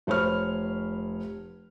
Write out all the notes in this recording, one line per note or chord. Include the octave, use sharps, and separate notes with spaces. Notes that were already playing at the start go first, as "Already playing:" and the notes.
F1 C5 C#5 B5 F6